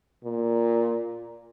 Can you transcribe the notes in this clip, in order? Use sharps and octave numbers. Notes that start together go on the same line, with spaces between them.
A#2